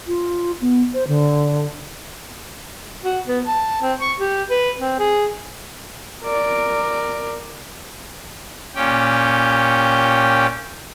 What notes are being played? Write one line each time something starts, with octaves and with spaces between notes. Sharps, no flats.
F4
B3
C5
D3
F#4
B3
A5
C4
C#6
G4
B4
C4
G#4
A#4 D5
A#2 C#4 G4 G5